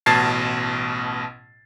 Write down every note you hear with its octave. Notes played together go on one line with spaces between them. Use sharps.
A1 B2 A5 G#6 A6 C7